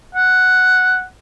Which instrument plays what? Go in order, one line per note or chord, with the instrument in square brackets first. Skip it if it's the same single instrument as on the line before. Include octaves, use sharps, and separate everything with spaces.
[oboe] F#5